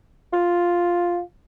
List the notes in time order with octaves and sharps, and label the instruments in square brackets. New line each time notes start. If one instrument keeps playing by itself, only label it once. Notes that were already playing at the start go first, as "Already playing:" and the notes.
[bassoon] F4